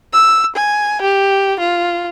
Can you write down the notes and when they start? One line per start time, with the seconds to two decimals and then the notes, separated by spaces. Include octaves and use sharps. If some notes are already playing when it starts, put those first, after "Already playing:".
0.13 E6
0.56 G#5
1.02 G4
1.60 F4